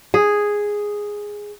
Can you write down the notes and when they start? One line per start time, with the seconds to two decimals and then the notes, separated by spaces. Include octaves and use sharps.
0.14 G#4